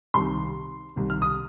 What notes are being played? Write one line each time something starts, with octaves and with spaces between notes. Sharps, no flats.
C2 C3 D#3 C6
C2 C3 D#3
F6
D#6